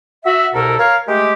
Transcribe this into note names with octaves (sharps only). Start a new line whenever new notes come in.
F#4 E5
C2 B2 A4 A#4
A#4 C#5 F5
G#3 A3 G4